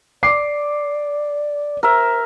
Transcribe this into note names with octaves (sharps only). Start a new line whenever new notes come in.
D5 D6 C7
A#4 C5 E5